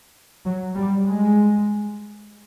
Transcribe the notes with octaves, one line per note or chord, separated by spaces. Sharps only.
F#3
G3
G#3